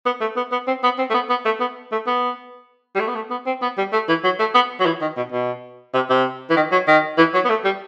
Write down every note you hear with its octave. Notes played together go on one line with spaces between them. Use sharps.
B3
A3
B3
B3
C4
B3
C4
A3
B3
B3
A3
B3
A3
B3
G3
A3
B3
A3
B3
C4
B3
G3
A3
E3
F#3
A3
B3
F#3
E3
D#3
B2
B2
C3
C3
E3
D#3
F#3
D#3
E3
F#3
B3
A3
G3